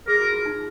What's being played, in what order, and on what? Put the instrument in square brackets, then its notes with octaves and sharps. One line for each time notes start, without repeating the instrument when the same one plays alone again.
[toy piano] G#4 [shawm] A#4
[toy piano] F#4
F4
D#4